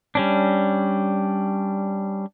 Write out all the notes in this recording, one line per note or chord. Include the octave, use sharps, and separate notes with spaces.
G3 C#4 D4